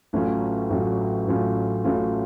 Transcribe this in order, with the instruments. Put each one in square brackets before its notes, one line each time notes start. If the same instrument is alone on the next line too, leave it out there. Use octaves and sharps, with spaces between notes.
[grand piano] A1 A2 F#3 C#4 F4
A1 A2 F#3 C#4 F4
A1 A2 F#3 C#4 F4
A1 A2 F#3 C#4 F4